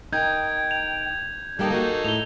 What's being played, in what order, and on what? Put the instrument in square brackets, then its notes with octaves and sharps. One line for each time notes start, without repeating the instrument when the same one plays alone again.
[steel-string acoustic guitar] D#4 A#4 [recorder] G5 [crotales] G6 G#6
[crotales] F7
[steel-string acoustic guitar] G3 A#3 [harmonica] D#4 A4 [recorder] G5
[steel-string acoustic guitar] A#3 F#4 [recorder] G#4
[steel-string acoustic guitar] A2 [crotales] F7 G7